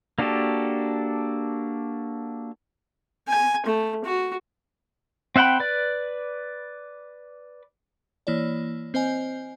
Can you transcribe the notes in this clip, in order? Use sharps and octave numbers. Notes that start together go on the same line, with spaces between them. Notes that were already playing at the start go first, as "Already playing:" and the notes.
A#3 D4 F#4 G4 A4
G#5
A3
F#4
C4 E5 F#5 G5 B5
B4 D5
E3 A#3 E4 C#5 D5
C4 C5 D#5 G#5